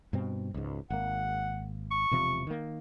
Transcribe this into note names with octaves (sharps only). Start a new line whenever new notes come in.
G2 B2 C4
C#2 G#2
G#1 A#3 F#5
C#6
E1 C3 F3
D#3 A#3